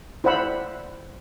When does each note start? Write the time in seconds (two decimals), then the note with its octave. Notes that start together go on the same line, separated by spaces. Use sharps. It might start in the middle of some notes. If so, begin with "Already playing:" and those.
0.24 E4 C5 D5 F#5 B5 E6